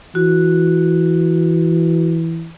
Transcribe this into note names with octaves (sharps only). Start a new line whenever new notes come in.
E3 F#4